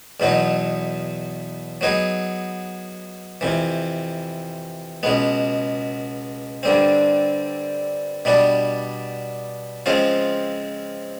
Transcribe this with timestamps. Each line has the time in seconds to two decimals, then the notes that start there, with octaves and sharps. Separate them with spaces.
0.20 E2 B2 F#3 B3 D#4
1.81 F#3 B3 D#4 G#4
3.41 F2 C3 E3
5.03 C#2 B2 G#3 B3
6.63 G2 D3 G3 C4
8.25 B2 G3 B3 D4
9.86 C#3 F3 G#3 C4 F4